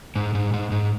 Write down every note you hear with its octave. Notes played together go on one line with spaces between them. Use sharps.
G#2
G#2
G#2
G#2